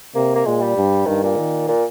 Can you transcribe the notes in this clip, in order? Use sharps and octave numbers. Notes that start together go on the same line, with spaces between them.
C3 A#3
A#3
A#2 G#3
G3
G2
G2 D#3
A#2
D#3
A#2